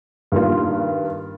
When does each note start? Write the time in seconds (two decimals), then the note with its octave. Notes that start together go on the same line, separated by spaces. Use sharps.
0.32 G2 D#3 G3 A#3 F4